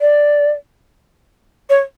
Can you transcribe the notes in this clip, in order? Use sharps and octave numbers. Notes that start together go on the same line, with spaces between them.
D5
C#5